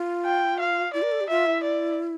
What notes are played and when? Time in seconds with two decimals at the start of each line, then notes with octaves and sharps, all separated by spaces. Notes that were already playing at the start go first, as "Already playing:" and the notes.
Already playing: F4
0.25 G5
0.59 F5
0.93 E4 D5
1.02 A#4
1.12 A4
1.21 G4
1.29 F4 E5
1.46 E4
1.63 D5